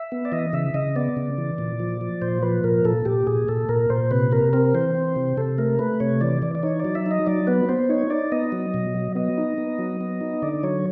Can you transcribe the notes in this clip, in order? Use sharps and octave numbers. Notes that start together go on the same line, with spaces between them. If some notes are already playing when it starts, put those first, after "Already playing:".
Already playing: E5
B3
D5
E3 D#5
C#3 E5
C#3 D#5
B3 D5
C#3
E3
A#2
F3
F3
A#2 C5
F3 B4
A#2 A#4
A#2 A4
A#2 G4
A#2 G#4
A#2 A4
A#2 A#4
A#2 C5
C3 B4
C3 A#4
C4 A#4
E3 C5
C4
C3
C3 A4
A3 A#4
A3 B4
C3 C#5
E3 D5
E3 D5
D5
D#4 C#5
D5
F#3
E5
D#4 D#5
F#3 D5
B3 B4
B3 C5
D#4 C#5
D#4 D5
B3 D#5
F#3
B2
F#3
B3 D#5
D#4
B3
F#3
B3
D#4
D3 D5
F#3 C#5